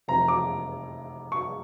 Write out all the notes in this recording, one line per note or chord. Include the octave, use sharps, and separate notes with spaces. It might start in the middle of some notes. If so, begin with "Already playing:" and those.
F1 F2 E3 A#5
D6
C#6